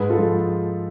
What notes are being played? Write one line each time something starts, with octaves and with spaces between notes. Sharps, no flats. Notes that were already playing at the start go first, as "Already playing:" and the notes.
Already playing: G#2 G#4 B4
F4 A4
F3